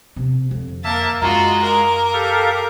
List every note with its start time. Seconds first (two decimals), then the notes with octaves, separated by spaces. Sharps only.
0.16 C3 D4
0.51 F2 D3
0.84 A#3 A#4 E5 A5
1.22 F#2 G#3 F4 F#4 A#5
1.62 A#3 A#4
2.13 G4 A4 F5